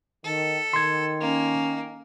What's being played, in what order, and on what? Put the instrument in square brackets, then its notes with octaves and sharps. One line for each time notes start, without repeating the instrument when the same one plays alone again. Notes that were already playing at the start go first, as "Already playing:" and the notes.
[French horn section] D#3 [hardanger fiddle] A4
[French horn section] D#3 [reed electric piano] C6 G#6
[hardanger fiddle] A#3 [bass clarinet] C#4